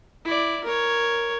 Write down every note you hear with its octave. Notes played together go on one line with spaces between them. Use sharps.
E4 D5
A#4 C#5